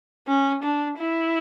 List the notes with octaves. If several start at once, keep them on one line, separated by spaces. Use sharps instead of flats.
C#4
D4
E4